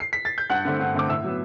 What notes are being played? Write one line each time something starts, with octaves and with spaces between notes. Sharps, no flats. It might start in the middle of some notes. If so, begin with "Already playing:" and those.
C7
B6
A6
G6
G2 F#5 F#6
D3 A3 C4
G2
D3 A3 C4 D6
A2 E5 E6
F#3 B3